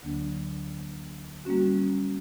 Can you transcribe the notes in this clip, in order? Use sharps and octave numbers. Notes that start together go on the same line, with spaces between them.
D2 D3 F#3 A#3 D4
G3 A#3 C#4 F#4